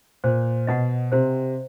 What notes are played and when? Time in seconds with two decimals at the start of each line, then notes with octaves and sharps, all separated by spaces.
0.24 A#2 C5
0.67 B2 D#5 F#5
1.12 C3 C5